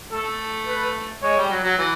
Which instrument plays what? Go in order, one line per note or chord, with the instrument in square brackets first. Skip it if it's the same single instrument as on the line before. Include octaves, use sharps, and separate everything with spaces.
[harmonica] A3 [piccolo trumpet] A4
[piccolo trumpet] B4
[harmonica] G#3 [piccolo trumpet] C#5
[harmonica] G3
F#3
F#3
E3